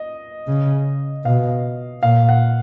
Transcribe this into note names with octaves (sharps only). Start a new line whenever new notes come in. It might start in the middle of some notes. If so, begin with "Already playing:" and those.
Already playing: D#5
C#3
B2 F5
A#2 F5
F#5